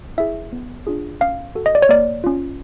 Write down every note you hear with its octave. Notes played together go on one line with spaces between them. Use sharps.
E4 G#4 E5
B3
D4 F4 G#4
C#4 F5
F#4 A4
D#5
D5
C#5
A#3 D5
C#4 F4